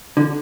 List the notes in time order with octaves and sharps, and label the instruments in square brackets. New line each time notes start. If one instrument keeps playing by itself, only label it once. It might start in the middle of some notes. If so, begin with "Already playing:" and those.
[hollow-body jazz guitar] D3